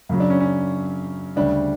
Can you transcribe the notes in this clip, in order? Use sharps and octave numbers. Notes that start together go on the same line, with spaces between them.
F#2 C#3 F#3
D4
C#4
C#4
D2 C#3 G3 D4